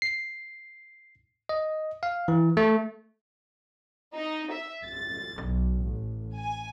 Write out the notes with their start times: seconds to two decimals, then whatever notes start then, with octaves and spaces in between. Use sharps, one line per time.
0.02 C7
1.49 D#5
2.03 F5
2.28 E3
2.57 A3
4.15 D#4
4.53 E5
4.84 A6
5.41 B1
5.81 A1
6.37 G#5